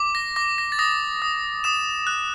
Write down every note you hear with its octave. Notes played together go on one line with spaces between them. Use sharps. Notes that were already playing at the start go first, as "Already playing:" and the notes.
Already playing: D6
A#6
D6 A#6
A#6
A6
D#6 A#6
D#6
D#6 E7
F#6